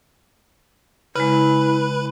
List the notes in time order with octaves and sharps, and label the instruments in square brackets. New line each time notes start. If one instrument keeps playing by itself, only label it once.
[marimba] C#3 G#3 [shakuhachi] E4 [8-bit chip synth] B4